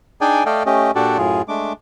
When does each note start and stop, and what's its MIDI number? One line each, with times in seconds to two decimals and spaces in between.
0.21 0.44 62
0.21 0.44 63
0.21 0.44 68
0.21 0.44 74
0.21 0.44 79
0.21 0.44 80
0.46 0.63 57
0.46 0.63 69
0.46 0.63 74
0.46 0.63 75
0.46 0.63 77
0.46 0.63 79
0.66 0.91 57
0.66 0.91 61
0.66 0.91 67
0.66 0.91 75
0.95 1.17 46
0.95 1.17 62
0.95 1.17 66
0.95 1.17 67
0.95 1.17 69
0.95 1.17 74
1.18 1.42 42
1.18 1.42 45
1.18 1.42 65
1.18 1.42 68
1.48 1.73 56
1.48 1.73 57
1.48 1.73 62
1.48 1.73 86